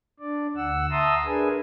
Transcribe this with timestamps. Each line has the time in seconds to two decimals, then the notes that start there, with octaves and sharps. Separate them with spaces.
0.20 D4 D5
0.56 D2 F#5 E6
0.91 E5 A5 A#5 C6 D#6 E6
1.26 D4 G#4 A#4 B4 G#5